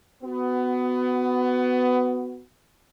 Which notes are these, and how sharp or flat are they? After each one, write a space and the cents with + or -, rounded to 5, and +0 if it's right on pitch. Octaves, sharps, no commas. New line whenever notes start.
B3 +20 F#4 +0